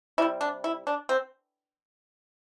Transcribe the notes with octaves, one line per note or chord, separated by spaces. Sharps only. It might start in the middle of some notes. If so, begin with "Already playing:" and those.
C3 G3 E4
D4
E4
D4
C4